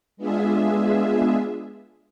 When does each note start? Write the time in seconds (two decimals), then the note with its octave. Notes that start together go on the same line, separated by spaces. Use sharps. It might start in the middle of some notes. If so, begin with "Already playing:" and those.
0.17 G#3 B3 D4 F4 G#4 E5